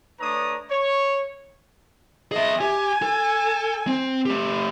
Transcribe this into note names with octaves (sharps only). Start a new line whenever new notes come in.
A3 D4 B4 C#5 A#5 D#6
C#5
G#4 D#5 E5
G4 G#5
A4
C4
A3 G4